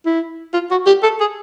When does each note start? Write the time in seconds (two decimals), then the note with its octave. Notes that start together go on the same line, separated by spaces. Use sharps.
0.06 E4
0.54 F4
0.71 F#4
0.86 G4
1.03 A4
1.20 G#4